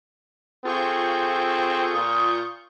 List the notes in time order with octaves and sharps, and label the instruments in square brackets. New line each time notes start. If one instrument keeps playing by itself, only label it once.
[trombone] C4 [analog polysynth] F4 C#6 G6 [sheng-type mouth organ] G#4 A4
[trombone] A#2 [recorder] D#6